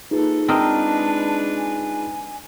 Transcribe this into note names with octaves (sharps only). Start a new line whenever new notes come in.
A#3 D#4 F4 G#4 A4 B4
G#3 C4 D4 A#4 B4 D#5 A5
G#5